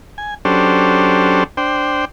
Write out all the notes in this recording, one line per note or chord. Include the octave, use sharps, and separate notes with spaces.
G#5
F#3 C#4 D4 G4 A4 C5
D4 C5 G5